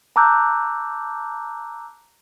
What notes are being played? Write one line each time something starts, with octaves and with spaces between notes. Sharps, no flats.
A5 A#5 D6 E6 F#6 G6